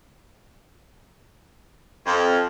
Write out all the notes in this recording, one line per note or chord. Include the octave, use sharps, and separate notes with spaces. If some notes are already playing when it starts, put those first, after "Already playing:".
F2